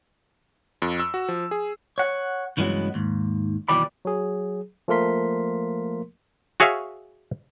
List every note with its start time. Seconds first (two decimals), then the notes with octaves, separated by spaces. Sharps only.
0.82 F2
1.00 E6
1.14 F#4
1.28 F3
1.51 G#4
1.98 C#5 F#5
2.57 C#2 G2 E3 F#3 G#3 B3
2.94 D#2 G#2
3.69 D#2 B2 E3 G3 D5 B5
4.05 F#3 G#4
4.88 F3 A3 A#3 A#4 C6 B6
6.60 F#4 G#4 C#5 E5 F5